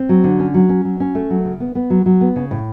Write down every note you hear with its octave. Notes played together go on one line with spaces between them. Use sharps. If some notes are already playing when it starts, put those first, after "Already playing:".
Already playing: C4
F#3
D3
C#4
F#3
C#4
F#3
C#4
A3
F#3
C#3
B3
B3
F#3
F#3
B3
C#3
A2